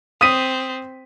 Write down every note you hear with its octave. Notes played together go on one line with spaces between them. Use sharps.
C4 D#6 B6 D#7